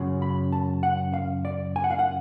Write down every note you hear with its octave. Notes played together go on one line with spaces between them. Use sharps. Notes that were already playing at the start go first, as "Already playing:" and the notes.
Already playing: F#2 C#3
B5
A5
F#5
F5
D5
G#5
F#5
F5
F#5